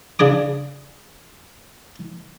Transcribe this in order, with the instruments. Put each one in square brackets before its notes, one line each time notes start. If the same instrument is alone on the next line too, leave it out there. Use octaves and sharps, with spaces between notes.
[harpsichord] C#3 D4 G#4 D6